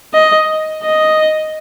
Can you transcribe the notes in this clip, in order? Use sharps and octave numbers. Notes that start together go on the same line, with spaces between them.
D#5
D#5